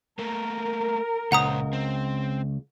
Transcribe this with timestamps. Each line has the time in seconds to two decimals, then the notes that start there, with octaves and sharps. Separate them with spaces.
0.19 A3 A#3 A#4
1.32 C#2 A#2 C5 F#5 A#5 D#6
1.73 C4